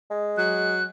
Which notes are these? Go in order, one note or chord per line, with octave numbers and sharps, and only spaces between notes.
G#3
F#3 F#6